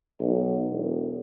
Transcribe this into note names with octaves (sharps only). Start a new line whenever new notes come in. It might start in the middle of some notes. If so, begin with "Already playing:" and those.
B1
E1